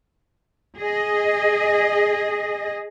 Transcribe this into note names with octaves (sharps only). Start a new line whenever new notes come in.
G#4 D#5